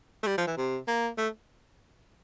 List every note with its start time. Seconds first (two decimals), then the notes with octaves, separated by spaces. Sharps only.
0.23 A3
0.27 G3
0.38 F3
0.47 E3
0.57 C3
0.88 A#3
1.18 A3